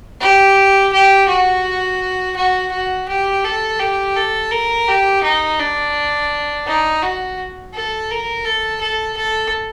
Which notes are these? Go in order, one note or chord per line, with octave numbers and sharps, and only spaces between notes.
G4
G4
F#4
F#4
F#4
G4
A4
G4
A4
A#4
G4
D#4
D4
D#4
F#4
A4
A#4
A4
A4
A4